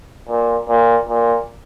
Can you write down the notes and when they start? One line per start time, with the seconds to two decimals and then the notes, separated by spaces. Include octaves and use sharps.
0.29 A#2
0.69 A#2
1.09 A#2